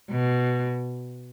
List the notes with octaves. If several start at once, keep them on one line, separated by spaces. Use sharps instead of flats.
B2